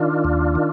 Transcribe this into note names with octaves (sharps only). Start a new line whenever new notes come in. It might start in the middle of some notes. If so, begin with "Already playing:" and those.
Already playing: D#3 D4 F4
D#2
D#3